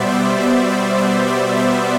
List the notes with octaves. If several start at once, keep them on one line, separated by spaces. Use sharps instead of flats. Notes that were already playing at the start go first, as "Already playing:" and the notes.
Already playing: B2 G3 B3 C5 D5 E5
D5
E5
D5
D5
D5
E5